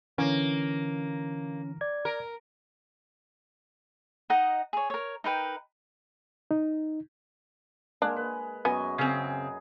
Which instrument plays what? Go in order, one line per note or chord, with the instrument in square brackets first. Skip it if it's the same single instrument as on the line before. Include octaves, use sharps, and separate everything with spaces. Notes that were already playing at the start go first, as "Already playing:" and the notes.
[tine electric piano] D3 E3 [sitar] A#3 [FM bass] C#4
[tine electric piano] D5 G#6
[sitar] A#4
[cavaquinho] D#4 D#5 F#5 A#5
G#4 C#5
A#4 C#5
D#4 A#4 B4 G5
[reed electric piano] D#4
[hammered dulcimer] G#3 A#3 [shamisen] D4
[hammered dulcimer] B4
[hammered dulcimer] F#2 D#5 [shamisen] B3 [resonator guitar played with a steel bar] G#5
[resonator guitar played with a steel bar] C#3 C4 [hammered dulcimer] G#4